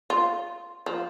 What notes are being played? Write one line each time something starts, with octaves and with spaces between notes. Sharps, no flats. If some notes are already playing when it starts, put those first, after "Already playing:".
F4
F3